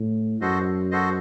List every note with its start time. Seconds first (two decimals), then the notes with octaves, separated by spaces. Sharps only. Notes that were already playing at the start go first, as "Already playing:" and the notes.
Already playing: A2
0.41 F#2 F#4 A4 C5 D#5
0.91 F#4 A4 C5 D#5